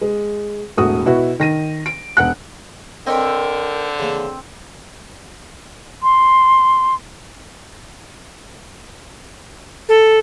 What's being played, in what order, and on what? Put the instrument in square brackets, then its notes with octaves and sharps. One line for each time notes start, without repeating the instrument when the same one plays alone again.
[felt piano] G#3
E1 A2 F#4 D#6
B2 E4 F#4
D#3 A#6 D#7
D7
E1 F#5 F#6
[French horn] D3 [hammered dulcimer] C4 [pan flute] A#4 [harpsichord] B4 C#5 D#5
[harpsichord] C#3 E3 A#3
[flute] C6
[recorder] A4